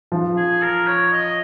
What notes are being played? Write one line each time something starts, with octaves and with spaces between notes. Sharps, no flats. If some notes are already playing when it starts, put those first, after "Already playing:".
F3
G#4
A#4
C#5
D#5